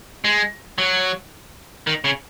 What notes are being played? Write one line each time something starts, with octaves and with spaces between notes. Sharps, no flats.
G#3
F#3
D#3
C#3